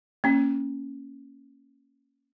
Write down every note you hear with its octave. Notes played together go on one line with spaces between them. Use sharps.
A#3 C#4